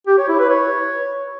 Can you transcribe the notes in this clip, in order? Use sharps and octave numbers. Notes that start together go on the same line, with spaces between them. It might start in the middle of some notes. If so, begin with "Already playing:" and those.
G4
C#5
E4
B4
C#5